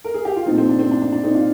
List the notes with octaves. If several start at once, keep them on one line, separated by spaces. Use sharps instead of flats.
A#4
G#4
G4
F4
A#2 F3 C4 D#4
C4
D4
C4
D4
D4
D4
C4 D#4
D4 F4